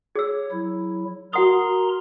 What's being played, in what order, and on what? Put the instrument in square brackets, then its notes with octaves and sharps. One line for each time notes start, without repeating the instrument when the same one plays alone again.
[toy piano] G#4 E6 [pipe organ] C#5
[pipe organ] F#3 E4
[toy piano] F#4 F#5 D#6 [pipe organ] A#4 A#5 C6